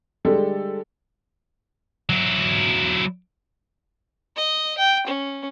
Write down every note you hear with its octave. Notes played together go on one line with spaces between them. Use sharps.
D3 G3 G#3 G4 A4
F#3 E4
D#5
G5
C#4